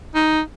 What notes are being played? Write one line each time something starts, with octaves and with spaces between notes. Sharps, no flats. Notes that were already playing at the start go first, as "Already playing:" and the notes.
D#4